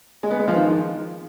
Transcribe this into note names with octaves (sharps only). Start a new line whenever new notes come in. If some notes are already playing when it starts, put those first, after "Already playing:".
G#3
B3
G#3
F3
D#3